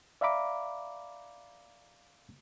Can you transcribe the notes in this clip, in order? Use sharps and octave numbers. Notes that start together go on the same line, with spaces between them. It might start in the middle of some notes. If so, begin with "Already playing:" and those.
D5 E5 F5 A#5 B5 D6